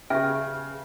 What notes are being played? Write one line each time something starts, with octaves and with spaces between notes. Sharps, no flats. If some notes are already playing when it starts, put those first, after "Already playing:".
C#3 G4 G#4 B4 E5 G5 F6